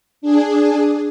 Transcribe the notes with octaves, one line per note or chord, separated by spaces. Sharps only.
D4 G#4